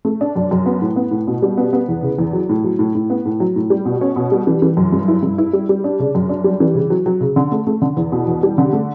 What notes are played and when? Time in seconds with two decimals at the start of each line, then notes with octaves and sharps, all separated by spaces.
0.05 A3
0.21 D4
0.36 F#2
0.51 F#2
0.66 B3
0.82 A2
0.96 B3
1.11 A2
1.27 B2
1.42 G3
1.57 B3
1.73 B3
1.88 E2
2.03 C#3
2.18 E2
2.33 F#3
2.49 A2
2.64 F#3
2.79 A2
2.95 A2
3.10 B3
3.25 A2
3.40 F#3
3.56 A2
3.70 G3
3.85 B2
4.01 C#4
4.16 B2
4.32 G3
4.47 E3
4.62 E3
4.77 F#2
4.92 G2
5.08 E4
5.23 G2
5.38 E4
5.53 G3
5.69 G3
5.84 D4
6.00 C#3
6.15 F#2
6.29 D4
6.44 G3
6.60 E3
6.75 C#3
6.90 F#3
7.06 F#3
7.21 C#3
7.36 D3
7.52 A3
7.67 A3
7.82 D3
7.97 E2
8.12 B2
8.27 E2
8.43 G3
8.58 D3
8.73 A3